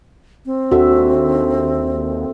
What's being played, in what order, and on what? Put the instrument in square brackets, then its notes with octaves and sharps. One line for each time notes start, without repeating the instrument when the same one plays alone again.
[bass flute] C4
[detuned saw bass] D#2 [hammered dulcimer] D3 E5 [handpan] F#4